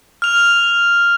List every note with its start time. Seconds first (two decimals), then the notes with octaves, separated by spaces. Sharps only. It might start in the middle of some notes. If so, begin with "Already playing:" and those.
0.22 F6 F7